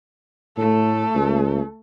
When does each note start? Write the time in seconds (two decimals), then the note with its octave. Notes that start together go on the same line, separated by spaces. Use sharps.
0.58 A2 A3 A4
1.14 C#2